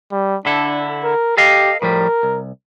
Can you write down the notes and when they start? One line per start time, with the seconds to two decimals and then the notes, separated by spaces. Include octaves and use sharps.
0.12 G3
0.46 D3 D4 E4 A4
1.04 A#4
1.37 G4 A4 D#5 F5
1.82 A2 F3 G3 A#4
2.23 C2